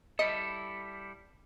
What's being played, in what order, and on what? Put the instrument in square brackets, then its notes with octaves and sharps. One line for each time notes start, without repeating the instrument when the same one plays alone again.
[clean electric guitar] G3 E4 A4 [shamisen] D#5